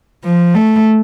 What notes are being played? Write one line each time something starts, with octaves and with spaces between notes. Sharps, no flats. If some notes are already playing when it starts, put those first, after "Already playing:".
F3
A3